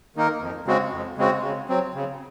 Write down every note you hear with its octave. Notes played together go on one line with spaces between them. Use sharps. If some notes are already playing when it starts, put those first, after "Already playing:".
D#3 A#3 D#4 A#4
F2
C#3 G#3 C4 F#4
F2
C#3 G#3 C4 F#4
C#3
F#3 C4
C#3